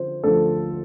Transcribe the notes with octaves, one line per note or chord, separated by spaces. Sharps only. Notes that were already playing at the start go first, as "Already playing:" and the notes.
Already playing: D3 F3 C5
D2 D3 F3 A4